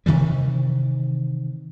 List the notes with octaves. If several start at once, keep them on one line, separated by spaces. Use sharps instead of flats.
C3 D#3 E3 G3